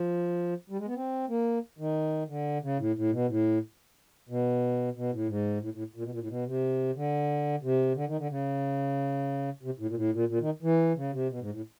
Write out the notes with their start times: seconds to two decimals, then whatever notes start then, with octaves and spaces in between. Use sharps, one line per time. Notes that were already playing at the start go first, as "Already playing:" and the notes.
Already playing: F3
0.70 G3
0.79 G#3
0.87 B3
0.95 C4
1.29 A#3
1.79 D#3
2.28 D3
2.63 C#3
2.79 A2
2.96 A2
3.12 B2
3.28 A2
4.29 B2
4.96 B2
5.13 A2
5.28 G#2
5.62 A2
5.74 A2
5.96 A#2
6.03 B2
6.12 A#2
6.21 A2
6.29 B2
6.46 C3
6.96 D3
7.63 C3
7.95 D3
8.07 D#3
8.18 D3
8.30 C#3
9.63 C3
9.79 A2
9.88 A#2
9.96 A2
10.12 A#2
10.29 A#2
10.40 D#3
10.63 E3
10.96 C#3
11.13 C3
11.30 B2
11.40 G#2
11.52 A2